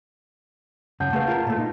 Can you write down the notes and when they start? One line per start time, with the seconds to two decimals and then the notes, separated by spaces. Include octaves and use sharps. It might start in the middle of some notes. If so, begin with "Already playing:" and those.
1.00 F#2 C#3 F#5 A5 G6
1.13 A3 G#4 B4 F5 A5
1.28 F4 A#4
1.47 A#2 A3
1.59 D#4